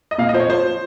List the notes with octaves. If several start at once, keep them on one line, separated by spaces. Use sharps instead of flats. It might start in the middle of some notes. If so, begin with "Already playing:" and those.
D#5
A#2 F5
D#5
F3 C5
C#5
F3 C5
F3